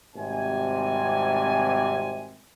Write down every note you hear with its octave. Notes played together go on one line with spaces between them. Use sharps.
G#1 C3 G3 G#5